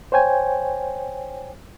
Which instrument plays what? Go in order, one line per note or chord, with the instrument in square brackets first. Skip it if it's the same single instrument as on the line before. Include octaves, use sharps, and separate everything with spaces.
[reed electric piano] C5 C#5 G5 G#5